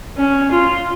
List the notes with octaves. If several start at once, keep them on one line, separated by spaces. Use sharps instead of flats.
C#4
F4